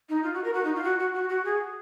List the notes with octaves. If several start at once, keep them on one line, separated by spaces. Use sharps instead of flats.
D#4
F4
F#4
A#4
F#4
D#4
F4
F#4
F#4
F#4
F#4
G#4